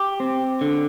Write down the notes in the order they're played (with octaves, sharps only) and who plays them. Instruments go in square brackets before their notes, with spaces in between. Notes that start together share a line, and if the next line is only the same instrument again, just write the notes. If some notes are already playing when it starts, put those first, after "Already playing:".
Already playing: [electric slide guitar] G4 [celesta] D6
[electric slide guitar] C4
D3